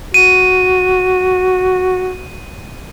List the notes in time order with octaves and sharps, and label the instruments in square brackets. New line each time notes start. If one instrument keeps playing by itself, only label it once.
[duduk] F#4 [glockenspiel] D#7